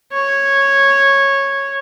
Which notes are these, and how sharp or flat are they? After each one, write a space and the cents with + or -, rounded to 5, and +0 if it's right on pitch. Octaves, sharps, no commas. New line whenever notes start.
C#5 -10